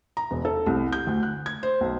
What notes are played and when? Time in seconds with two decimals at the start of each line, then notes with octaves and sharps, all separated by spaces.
0.17 A#5
0.31 E1
0.45 A4
0.67 C2
0.93 G6
1.07 D2
1.23 F#6
1.46 G#6
1.63 C5
1.81 B1